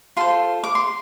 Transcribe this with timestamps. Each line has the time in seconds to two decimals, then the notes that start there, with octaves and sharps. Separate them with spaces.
0.17 F4 A4 C5 C6
0.64 D6
0.75 C6